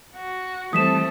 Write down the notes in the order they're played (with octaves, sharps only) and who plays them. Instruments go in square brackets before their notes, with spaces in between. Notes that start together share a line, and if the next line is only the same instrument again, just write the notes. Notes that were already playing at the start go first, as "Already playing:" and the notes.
[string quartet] F#4
[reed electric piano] E3 G3 [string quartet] A3 C4 A4 [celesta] D#6 B6 E7